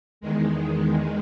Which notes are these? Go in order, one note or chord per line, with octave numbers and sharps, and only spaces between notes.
E2 D#3 G#3